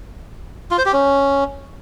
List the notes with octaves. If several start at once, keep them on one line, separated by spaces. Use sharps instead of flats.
F4
C5
G4
C#4